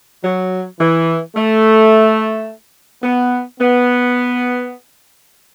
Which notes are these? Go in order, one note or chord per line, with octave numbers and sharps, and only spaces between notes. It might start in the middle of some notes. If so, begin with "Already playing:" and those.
F#3
E3
A3
B3
B3